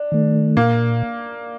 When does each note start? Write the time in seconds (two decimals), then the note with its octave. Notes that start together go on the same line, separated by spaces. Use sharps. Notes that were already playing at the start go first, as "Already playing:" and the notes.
Already playing: D4
0.12 D#3 A3
0.57 A#2 A#3